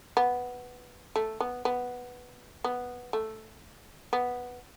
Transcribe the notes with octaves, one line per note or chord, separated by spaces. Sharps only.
B3
A3
B3
B3
B3
A3
B3